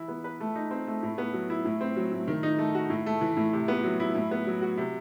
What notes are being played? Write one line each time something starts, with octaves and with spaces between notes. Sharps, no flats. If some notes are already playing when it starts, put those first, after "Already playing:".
Already playing: E3 E4
B3
B4
A3
D#4
C4
A3
A2
B3
F#3
E4
A2
C4
F#3
A2
D#3
D#4
A3
F#4
A2
A3
E3
A2
C3
B3
F#3
E4
A2
B3
F#3
F#4
C3